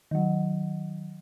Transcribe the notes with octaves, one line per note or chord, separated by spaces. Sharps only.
D#3 F#3